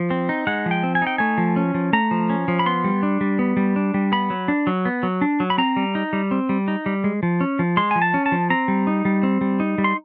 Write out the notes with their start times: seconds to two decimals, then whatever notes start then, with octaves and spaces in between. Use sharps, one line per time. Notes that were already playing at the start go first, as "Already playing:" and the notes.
Already playing: F3
0.10 C4
0.29 D#4
0.47 G#3 F#5
0.66 F3
0.71 G5
0.83 C4
0.95 G#5
1.02 D#4 G5
1.18 A3 G#5
1.38 F3
1.56 C#4
1.74 F3
1.93 A3 A#5
2.11 F3
2.30 C#4
2.48 F3
2.59 B5
2.66 B3 C6
2.84 G3
3.03 D4
3.21 G3
3.39 B3
3.57 G3
3.76 D4
3.94 G3
4.12 B3 B5
4.30 F#3
4.48 D4
4.67 F#3
4.85 B3
5.03 F#3
5.21 D4
5.40 F#3
5.50 B5
5.58 C4 A#5
5.76 G3
5.95 D#4
6.13 G3
6.31 C4
6.49 G3
6.68 D#4
6.86 G3
7.04 G#3
7.23 F3
7.41 C#4
7.59 F3
7.77 G#3 C6
7.91 F3 G#5
8.02 A5
8.14 C#4
8.26 A5
8.32 F3
8.50 C4 A#5
8.68 G3
8.87 D#4
9.05 G3
9.23 C4
9.41 G3
9.60 D#4
9.78 G3
9.84 C6